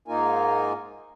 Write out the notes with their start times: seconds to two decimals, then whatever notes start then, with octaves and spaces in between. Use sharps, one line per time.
0.08 G#2 A#3 D#4 F4 A#4 G#5